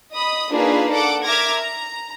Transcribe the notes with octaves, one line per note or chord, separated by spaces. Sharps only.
D#5 B5 D#6
A#3 D4 D#4 F4 G#4 B4
A4 F#5 D6
A#4 E5 D6 F6 G#6 A#6
A#5